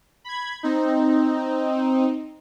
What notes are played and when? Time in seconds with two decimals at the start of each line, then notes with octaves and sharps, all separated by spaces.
0.24 B5 G#6
0.63 C4 D#4